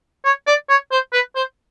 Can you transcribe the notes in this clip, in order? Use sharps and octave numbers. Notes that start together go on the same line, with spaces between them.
C#5
D5
C#5
C5
B4
C5